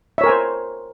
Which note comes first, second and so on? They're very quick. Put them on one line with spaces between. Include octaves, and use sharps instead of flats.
E5 C#5 A#4 G#5 C5